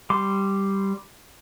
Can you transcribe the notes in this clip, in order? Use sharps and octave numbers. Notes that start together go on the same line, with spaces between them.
G3 C6 D6